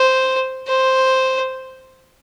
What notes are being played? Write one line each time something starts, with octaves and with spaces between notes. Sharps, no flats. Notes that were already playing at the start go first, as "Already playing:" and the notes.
Already playing: C5
C5